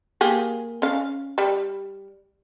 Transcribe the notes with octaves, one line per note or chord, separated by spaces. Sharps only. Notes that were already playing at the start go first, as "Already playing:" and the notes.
A#3 G4 G#4
C#4 F5
G3